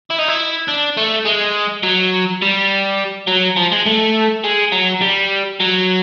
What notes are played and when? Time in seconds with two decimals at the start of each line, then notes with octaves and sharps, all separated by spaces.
0.11 E4
0.19 D#4
0.28 E4
0.68 D4
0.97 A3
1.25 G#3
1.83 F#3
2.42 G3
3.28 F#3
3.56 F3
3.72 G#3
3.86 A3
4.44 G#3
4.72 F#3
5.01 G3
5.60 F#3